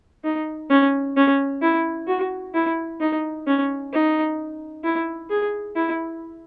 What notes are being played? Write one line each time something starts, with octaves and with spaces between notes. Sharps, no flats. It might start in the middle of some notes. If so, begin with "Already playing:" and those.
D#4
C#4
C#4
E4
F#4
E4
D#4
C#4
D#4
E4
G#4
E4